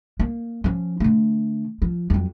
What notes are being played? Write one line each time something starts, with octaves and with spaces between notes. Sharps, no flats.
A#3
F3 C#4
D3 A3
F3
F2 F#3